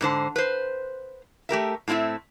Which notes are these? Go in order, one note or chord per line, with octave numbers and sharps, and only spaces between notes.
G#2 D3 C5 A5
B4 C5
A3 G4 A#4 E5
A2 A3 C4 E4 E5